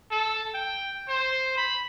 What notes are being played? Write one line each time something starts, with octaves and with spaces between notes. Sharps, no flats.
A4
G5
C5
B5